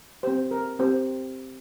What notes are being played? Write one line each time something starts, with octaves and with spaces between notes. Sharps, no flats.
C4 G4 C5
A#4
C4 G4 C5